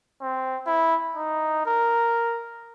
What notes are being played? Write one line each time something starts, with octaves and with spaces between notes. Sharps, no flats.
C4
E4
D#4
A#4